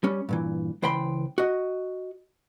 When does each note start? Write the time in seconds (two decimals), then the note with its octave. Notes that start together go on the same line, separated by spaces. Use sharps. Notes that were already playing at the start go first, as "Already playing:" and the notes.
0.04 G3 C#4
0.29 G2 A#2 E3
0.82 C#2 E3 C5 G5 B5 C6
1.38 F#4 D#5